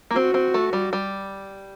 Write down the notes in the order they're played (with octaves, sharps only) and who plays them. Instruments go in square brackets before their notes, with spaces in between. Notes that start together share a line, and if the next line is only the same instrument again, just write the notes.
[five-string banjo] A#3
[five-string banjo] C4 [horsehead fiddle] F#4
[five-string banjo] C4
A3
G3
G3